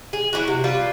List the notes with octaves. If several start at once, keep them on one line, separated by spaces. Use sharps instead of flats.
G#4
F#3 G3 E4 F#4
C3
G3 F4 B4